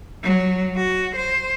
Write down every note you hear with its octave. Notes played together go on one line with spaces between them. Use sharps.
F#3
F#4
C5